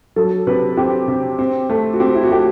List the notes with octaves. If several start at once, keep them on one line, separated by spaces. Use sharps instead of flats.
F#3 A4
C3 B4
C4 G4
C3
C4
A3
F#4
C4 G4
E4
F#4
A3 G4